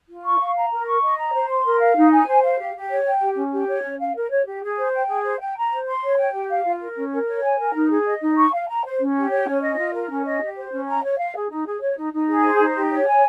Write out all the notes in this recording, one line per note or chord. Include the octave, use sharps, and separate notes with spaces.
F4
C#6
F5
A#5
A#4
C#6
D#5
A#5
C5
C6
A#4
F5
D#4
G#5
C5
F5
G4
G4
C#5
G5
G4
C#4
G4
C#5
C#4
F5
A#4
C#5
G4
G#4
C5
G5
G#4
C5
G5
A#5
C5
C6
C#5
G5
G4
F5
F4
A#4
C#4
A#4
C#5
G#5
A#4
D#4
G#4
D#5
D#4
C#6
F5
A#5
C5
C#4
G4
C#5
C#4
D#5
F4
A#4
C#4
D#5
G4
C5
C#4
A#5
C#5
F5
G#4
D#4
G#4
C#5
D#4
D#4
G#4
C5
D#4
G4
C#5
G#5